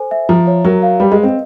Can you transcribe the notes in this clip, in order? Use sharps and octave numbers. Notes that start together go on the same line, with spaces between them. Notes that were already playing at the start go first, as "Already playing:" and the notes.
Already playing: A4 C5 G#5
E5
F3 A#5
C#5
F#3 A#4
F5
G3 B4
G#3
D#5
C4